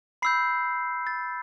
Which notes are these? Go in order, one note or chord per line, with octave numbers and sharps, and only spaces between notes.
B5 E6 G6 C7
A6